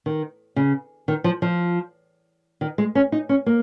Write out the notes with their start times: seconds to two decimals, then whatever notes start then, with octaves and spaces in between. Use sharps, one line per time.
0.06 D#3
0.56 C#3
1.08 D#3
1.24 F3
1.42 F3
2.61 D#3
2.78 G#3
2.95 C#4
3.12 D#4
3.29 C#4
3.46 A#3